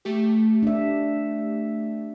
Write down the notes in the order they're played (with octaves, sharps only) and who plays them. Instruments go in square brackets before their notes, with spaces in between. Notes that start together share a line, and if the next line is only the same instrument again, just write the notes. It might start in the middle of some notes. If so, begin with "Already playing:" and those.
[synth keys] A3 G4
[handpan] D4 E5